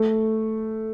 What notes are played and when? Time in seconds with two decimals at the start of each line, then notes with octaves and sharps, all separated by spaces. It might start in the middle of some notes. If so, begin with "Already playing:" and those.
Already playing: A3